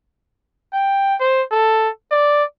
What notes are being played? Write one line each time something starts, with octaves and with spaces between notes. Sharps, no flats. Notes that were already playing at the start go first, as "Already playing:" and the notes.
G5
C5
A4
D5